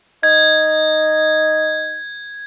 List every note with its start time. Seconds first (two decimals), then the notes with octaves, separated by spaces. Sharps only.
0.23 D#4 G#6